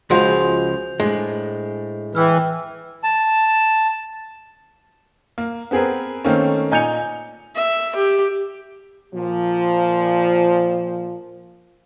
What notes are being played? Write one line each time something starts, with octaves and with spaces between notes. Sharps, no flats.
C#2 F3 G#3 F#4 G#4 C5 G6 F7
A2 G#3 D4
E3 G5 E6 F6
A5
A#3
B3 C4 G#4 A#4 B4
D#3 A3 A#3 C4 C#4
A#2 D#4 G#5 G6 C#7 F7
E5
G4
A#2 F3